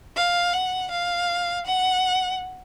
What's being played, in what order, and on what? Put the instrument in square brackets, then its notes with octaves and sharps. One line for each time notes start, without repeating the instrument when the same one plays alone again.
[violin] F5
F#5
F5
F#5